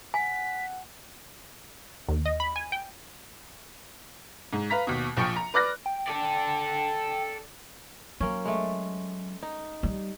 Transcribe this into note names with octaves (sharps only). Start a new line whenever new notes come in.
F#5 G#5 B6
D#2
D#5
B5
G#5
G5
G#2
B4 F5 A#5 B6
D#2 B2
A#1 F3 G5 C#6 C#7
A#5
B4 D5 D6 F6 F#6 A#6
G5
A4 D5
F#3 A#3 C#4
G#3 A3
D#4
G3